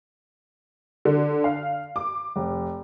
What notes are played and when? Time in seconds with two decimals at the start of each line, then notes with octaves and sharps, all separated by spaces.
1.05 D3
1.44 F5
1.96 D6
2.36 F1